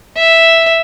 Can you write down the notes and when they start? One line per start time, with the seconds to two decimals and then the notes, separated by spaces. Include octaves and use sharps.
0.17 E5